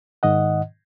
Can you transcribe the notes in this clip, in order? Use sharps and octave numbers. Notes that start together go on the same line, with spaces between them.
G#2 D#3 D#5 F#5